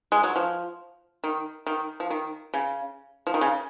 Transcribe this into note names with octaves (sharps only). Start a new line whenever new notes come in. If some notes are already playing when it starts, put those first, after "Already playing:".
G#3
F#3
F3
D#3
D#3
F3
D#3
C#3
F3
D#3
C#3